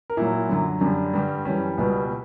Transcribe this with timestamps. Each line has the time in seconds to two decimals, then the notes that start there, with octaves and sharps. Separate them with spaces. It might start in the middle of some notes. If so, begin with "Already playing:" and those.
0.10 A#4
0.17 A#2 F#3 E4
0.49 F#2 D3 F#3
0.81 F#2 D3 G3 D4
1.13 G2 D3 G3
1.45 F#2 E3 G3 C#4
1.77 C#2 B2 G3 B3